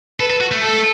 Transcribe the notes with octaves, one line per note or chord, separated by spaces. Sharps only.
A4 B4
A4
F#4
A3
A4